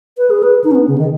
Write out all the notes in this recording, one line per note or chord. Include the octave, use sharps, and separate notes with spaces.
B4
G#4
B4
D#4
C#4
B3
C#3
D#3